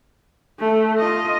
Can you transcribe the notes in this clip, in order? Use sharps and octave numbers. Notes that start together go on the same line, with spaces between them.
A3
F4 D#5